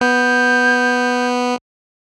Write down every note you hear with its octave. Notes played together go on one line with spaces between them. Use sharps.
B3 G6